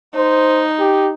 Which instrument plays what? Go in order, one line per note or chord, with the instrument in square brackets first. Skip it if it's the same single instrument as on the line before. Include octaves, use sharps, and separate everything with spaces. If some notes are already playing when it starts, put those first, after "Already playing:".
[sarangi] D#4 [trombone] C5
[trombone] G4